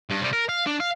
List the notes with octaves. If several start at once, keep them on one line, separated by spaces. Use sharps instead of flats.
G2
C3 G3
A#4
F5
D4
F5